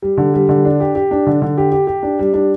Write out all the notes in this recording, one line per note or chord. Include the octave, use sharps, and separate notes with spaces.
G3
D3
G3
D3
D4
G4
G4
D4
D3
D3
G4
G4
G4
D4
G3
D4